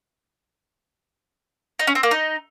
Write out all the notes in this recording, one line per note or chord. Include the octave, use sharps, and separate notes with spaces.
D#4
C#4
C4
A#3
D#4